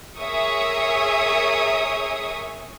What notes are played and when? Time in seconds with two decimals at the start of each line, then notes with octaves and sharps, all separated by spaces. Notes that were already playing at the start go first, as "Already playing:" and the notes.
0.20 G#4 A#4 C#5 E5 C#6 D#6